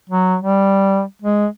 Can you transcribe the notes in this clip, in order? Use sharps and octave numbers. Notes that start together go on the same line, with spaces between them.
F#3
G3
G#3